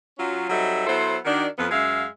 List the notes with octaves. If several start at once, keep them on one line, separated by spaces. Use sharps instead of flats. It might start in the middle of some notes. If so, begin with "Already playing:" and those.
F#3 C#4 F4
F#3 G3 C4 D#4 A4 E5
F#3 B3 E4 A4 C5
D#3 D4 F#4
F2 F3 B3
F#2 G#3 E5 F5